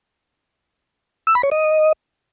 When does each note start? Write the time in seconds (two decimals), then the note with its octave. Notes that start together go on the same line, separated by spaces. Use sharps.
1.27 E6
1.35 B5
1.43 C#5
1.52 D#5